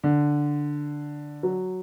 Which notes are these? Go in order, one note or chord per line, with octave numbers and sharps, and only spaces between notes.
D3
F#3